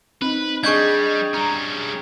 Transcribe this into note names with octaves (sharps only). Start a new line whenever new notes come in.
C4 D#4 B4
G3 D4 G#4 D#5 C#6 G6 G#6
G3 C#4 A#5